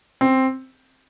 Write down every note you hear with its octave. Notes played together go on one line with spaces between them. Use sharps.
C4